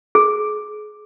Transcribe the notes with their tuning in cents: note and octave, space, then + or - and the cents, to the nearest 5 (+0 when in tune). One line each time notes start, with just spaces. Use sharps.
G#4 +25